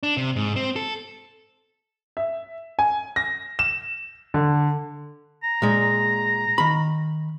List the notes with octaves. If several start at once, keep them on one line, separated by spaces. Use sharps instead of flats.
D4
C3
G#2
C4
A4
E5
G#5
A#6
E7
D3
A#5
A#2 G#3
D#3 B5